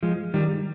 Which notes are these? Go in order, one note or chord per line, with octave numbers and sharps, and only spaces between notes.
F3 G#3
D#3 G3